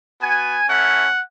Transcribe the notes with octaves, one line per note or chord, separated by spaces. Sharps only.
B3 F#4 G#5
A3 C#4 E4 F#5